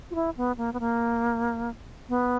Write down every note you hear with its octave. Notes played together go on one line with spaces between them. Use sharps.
F4
E4
B3
A#3
B3
A#3
B3